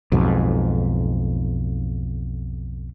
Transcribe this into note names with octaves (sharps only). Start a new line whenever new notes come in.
B1 F2 G#2